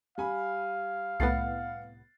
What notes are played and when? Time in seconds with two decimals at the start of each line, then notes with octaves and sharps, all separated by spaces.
0.18 G3 F5 G#5 B5
1.20 C2 A2 B3 F#5 A6 C7